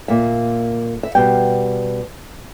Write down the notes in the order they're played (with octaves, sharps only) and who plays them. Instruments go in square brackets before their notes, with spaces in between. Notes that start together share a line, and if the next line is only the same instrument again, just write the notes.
[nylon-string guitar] A#2 A#3 E5
E5
B2 G3 B3 G5